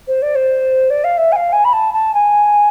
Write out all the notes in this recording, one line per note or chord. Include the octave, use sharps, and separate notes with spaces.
C5
D5
C5
D5
F5
E5
G#5
F5
G#5
B5
A5
A5
G#5